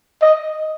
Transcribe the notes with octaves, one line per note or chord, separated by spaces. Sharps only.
D#5